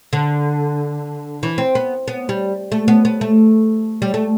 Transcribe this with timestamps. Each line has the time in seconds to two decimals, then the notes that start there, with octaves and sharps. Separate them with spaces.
0.13 D3
1.43 E3
1.58 C4
1.75 B3
2.08 B3
2.29 G3
2.72 A3
2.88 B3
3.05 B3
3.21 A3
4.02 G3
4.14 A3